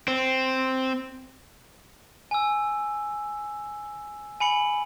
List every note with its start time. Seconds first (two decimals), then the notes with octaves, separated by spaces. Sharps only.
0.08 C4
2.31 G#5 E6
4.40 G#5 B5 C#7 F#7